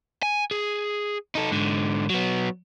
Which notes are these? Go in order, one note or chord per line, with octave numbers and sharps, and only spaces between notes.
G#5
G#4
D#4 A4
G#2 D3
F#3 B3